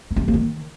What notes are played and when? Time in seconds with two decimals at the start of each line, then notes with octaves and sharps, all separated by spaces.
0.11 D#4
0.16 C#4
0.22 G#3
0.28 A#3
0.34 D#3